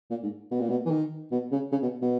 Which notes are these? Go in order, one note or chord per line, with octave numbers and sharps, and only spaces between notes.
A#2
G#2
B2
A#2
B2
E3
D#3
B2
C#3
C#3
B2
B2